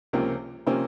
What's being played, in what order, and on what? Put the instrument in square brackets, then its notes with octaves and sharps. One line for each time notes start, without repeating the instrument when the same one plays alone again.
[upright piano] C#2 C3 F3 A#3 C#4
C3 F3 A#3 C#4 C5